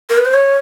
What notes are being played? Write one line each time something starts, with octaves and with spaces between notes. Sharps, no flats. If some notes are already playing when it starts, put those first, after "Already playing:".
A#4
B4
C5
C#5